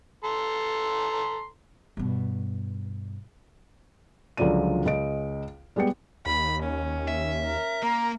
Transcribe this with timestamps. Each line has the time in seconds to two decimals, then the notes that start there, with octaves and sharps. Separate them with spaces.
0.24 A4 A#5 C6
1.97 G2 B2
4.37 C#2 D3 F3 F#3 D5 D#7
4.86 C#2 D#5 D7
5.76 G3 G#3 B3 G5 C#7
6.26 D#2 B5
6.64 C#4
7.08 E5
7.45 A#4
7.83 A#3 A#5